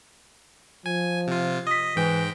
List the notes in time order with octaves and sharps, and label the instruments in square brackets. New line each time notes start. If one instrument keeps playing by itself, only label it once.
[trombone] F3 [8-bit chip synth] G#5
[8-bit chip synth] C3 F4
[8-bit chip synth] D#5 [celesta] D#6 B6
[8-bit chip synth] G#2 G5 [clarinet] E3